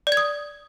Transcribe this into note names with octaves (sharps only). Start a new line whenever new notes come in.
D5
G#6
D#6